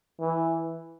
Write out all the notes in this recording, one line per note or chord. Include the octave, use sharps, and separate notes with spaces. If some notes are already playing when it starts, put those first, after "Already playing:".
E3